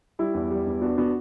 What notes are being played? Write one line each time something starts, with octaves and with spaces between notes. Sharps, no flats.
G3 E4
E2
G3
E2
B3 D4 F#4
B3 D4 F#4